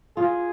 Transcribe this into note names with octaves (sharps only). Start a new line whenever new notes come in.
F4 G#4